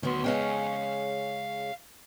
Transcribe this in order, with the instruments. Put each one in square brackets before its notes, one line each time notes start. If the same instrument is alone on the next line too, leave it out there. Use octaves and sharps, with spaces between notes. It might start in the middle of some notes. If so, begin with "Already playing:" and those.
[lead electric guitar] D2 C6 [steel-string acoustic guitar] D#3 F#3 B3
[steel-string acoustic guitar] C#3 G#3 C#4 [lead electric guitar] F5 G5